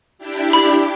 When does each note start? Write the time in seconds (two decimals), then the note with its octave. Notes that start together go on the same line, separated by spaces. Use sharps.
0.18 D4 E4 G4
0.53 B5